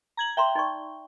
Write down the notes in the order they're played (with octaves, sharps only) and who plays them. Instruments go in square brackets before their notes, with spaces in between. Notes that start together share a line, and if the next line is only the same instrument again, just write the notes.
[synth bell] A#5 G#6 F#7
[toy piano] E5 A#5 C6 [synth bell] G5
[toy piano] D#4 D5 C#6